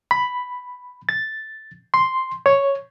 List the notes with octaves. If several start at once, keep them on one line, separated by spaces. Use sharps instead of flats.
B5
A6
C6
C#5